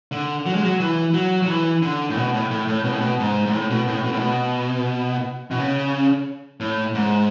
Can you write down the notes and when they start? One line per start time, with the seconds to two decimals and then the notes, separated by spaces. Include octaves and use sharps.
0.12 D3
0.46 F#3
0.55 G#3
0.63 F#3
0.80 E3
1.14 F#3
1.42 F#3
1.48 E3
1.82 D3
2.10 A2
2.17 B2
2.34 A2
2.51 A2
2.68 A2
2.85 B2
2.92 A2
3.00 B2
3.19 G#2
3.46 G#2
3.53 A2
3.70 B2
3.87 A2
4.04 B2
4.12 A2
4.18 B2
5.51 B2
5.58 C#3
6.60 A2
6.95 G#2